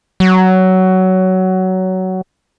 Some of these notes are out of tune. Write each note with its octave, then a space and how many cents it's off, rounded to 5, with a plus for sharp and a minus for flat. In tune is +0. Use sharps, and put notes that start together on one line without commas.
F#3 +15